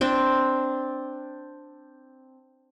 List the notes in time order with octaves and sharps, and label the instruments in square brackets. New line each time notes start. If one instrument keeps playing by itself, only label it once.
[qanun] C4 D4